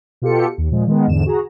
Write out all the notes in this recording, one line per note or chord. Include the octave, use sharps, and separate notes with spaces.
B2 F4 G4 A4 C#7
D#2
A#2 F3 G#3
D#3 G#3 B3
E2 G#2 D3 E7
F#4 G#4 A#5